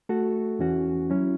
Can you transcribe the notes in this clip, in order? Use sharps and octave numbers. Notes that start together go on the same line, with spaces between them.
A3 F#4 A4
E2 E3 C#4 F#4
F#3 C#4 E4